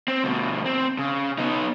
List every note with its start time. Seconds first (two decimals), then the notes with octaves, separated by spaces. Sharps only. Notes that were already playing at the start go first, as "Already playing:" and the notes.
0.08 C4
0.24 D2 B2
0.66 C4
0.98 C#3
1.38 B3 D#4